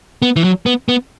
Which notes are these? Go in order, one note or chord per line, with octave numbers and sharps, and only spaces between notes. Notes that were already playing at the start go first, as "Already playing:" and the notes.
B3
E3
F#3
B3
B3